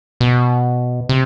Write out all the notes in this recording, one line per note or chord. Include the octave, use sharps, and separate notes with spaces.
B2
C3